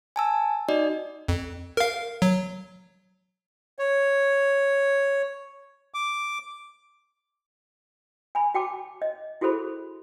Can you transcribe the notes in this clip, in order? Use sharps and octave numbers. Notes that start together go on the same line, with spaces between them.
G#5 A5 E6
D#4 F#4 D5 D#5
F2
A#4 F5
F#3
C#5
D6
G#5 B5
F#4 G5 A5 D6
D#5
E4 F#4 G#4 A4 C5 B5